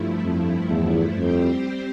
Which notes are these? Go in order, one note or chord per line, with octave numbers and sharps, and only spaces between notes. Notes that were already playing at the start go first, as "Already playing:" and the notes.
Already playing: G2 F3 A3 E4
F2
E2
F2 G3 C4 G4 C5